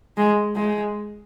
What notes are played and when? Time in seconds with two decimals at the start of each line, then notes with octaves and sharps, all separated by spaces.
0.17 G#3
0.56 G#3